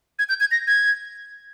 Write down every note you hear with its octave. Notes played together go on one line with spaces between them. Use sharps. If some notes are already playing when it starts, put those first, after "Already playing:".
G#6
G6
G#6
A#6
G#6